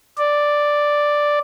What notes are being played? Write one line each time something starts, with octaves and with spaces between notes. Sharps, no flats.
D5